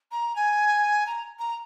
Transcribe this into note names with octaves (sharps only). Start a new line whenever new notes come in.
A#5
G#5
A#5
A#5